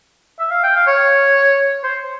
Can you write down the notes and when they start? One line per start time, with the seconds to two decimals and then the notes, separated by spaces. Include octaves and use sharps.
0.39 E5
0.50 F5
0.63 G5
0.76 F5
0.87 C#5
1.84 C5